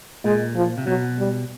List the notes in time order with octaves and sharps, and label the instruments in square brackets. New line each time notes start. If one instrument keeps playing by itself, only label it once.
[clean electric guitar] A#2 [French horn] G#3
[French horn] F3
[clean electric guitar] C3
[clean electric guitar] B2 [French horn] F#3
[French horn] G3